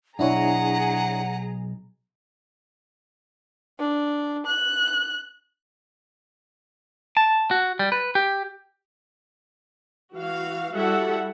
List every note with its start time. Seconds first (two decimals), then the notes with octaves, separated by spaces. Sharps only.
0.19 B1 F#2 D4 E4 G#4 C#5 F#5 A#5
3.79 D4
4.46 F#6
7.17 A5
7.51 F#4
7.79 G3
7.92 B4
8.15 G4
10.15 E3 F#4 F5
10.74 G3 E4 F#4 A4 E5 F#5